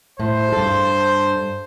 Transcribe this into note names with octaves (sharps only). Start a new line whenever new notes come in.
A2 C5
G2 A4